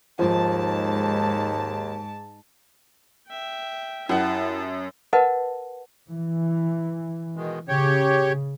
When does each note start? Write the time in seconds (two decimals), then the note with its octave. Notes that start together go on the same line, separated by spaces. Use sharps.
0.19 D#2 G#2 F3 A5
3.28 E5 G5
4.09 F#2 E4 G4 F#5 A5
5.13 A#4 B4 D#5 F#5 A5
6.11 E3
7.36 B2 D#3 G#3
7.68 C#3 G4 C#5